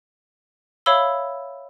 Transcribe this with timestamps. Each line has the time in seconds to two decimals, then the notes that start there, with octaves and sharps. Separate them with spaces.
0.86 C#5 E5 F5 B5 E6 G7